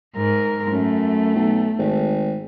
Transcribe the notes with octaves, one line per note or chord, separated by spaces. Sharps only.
G#2 A#4
F#2 A3
B1
G#1